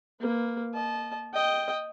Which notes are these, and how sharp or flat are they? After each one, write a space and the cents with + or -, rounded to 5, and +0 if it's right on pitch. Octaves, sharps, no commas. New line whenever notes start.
A#3 +0 B4 +15
D#5 -20 A5 -25
D#5 +0 G5 +0